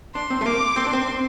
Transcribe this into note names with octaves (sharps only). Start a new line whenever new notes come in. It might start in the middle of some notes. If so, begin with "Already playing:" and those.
D4 C6
C4
A3
A#3 D6
C4 C6
D4
C4